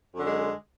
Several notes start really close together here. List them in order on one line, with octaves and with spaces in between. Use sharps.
F#2 D3 G#3